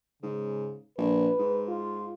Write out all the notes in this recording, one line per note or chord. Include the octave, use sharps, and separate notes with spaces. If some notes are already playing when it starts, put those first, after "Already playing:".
G#2 C#3
A#1 B4
G#2
F4